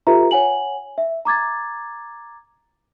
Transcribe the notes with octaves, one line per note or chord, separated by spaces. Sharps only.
F4 G4 A4 B4 E5 A#5
C#5 F#5 G#5 F#7
E5
A#5 D6 G#6 A6